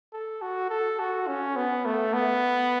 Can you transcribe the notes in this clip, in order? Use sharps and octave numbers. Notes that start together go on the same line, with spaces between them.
A4
F#4
A4
F#4
C#4
B3
A3
B3